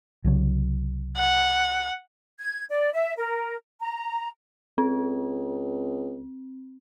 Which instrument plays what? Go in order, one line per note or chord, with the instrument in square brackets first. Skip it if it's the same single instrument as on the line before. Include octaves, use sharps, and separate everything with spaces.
[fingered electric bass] C2 C#3 F#3
[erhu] F#5
[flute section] G#6
D5
E5
A#4
A#5
[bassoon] C#2 [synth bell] C4